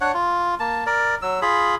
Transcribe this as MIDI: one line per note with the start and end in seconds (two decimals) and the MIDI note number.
0.01 0.12 62
0.01 0.12 73
0.01 0.12 78
0.14 0.55 65
0.60 0.84 58
0.60 0.84 81
0.86 1.15 70
0.86 1.15 74
1.22 1.40 54
1.22 1.40 88
1.42 1.75 65
1.42 1.75 68
1.42 1.75 83